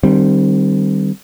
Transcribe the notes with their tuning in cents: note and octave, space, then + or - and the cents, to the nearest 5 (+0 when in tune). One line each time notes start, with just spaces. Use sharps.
D#3 -40 G3 -5 C4 +0